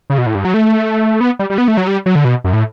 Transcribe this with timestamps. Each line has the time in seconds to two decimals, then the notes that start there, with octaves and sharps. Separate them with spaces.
0.10 C#3
0.18 B2
0.26 A2
0.35 G2
0.45 F#3
0.54 A3
1.21 B3
1.39 G3
1.50 G3
1.58 B3
1.68 A3
1.77 F#3
1.87 G3
2.06 F#3
2.15 D3
2.25 B2
2.44 F#2
2.53 A2